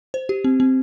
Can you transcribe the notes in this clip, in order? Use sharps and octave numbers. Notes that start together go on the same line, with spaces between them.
C5
G4
C4
C4